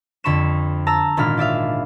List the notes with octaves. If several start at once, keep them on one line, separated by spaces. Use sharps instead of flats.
F2 D3 B5 C#6 E7
A5 A#5 E6
G#1 A#2 D4 B5 F6
F4 D5 E5 F5